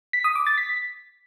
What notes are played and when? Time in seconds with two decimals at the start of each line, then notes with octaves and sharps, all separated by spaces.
0.13 B6
0.24 D#6
0.35 D6
0.47 A6
0.58 B6